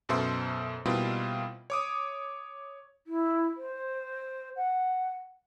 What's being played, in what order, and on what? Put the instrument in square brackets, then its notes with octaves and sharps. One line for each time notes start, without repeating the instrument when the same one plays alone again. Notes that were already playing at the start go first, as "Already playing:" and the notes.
[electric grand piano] F#2 B2 A4 C5 E5 C6
B2 G3 A#3 C4 E4 F4
C#5 D6 D#6
[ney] E4
C5
F#5